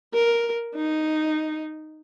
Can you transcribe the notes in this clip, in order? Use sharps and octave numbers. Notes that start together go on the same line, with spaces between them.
A#4
D#4